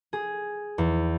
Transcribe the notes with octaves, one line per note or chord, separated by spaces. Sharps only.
G#4
E2